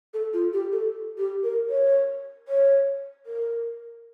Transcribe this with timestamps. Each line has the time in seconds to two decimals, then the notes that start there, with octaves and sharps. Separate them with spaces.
0.14 A4
0.33 F4
0.53 G4
0.72 A4
1.18 G4
1.43 A#4
1.70 C#5
2.48 C#5
3.26 A#4